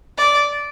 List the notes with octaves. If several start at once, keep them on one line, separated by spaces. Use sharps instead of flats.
D5